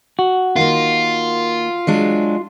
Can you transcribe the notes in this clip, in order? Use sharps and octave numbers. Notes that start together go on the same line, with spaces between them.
F#4
D#3 A#3 F4
F#3 G#3 D4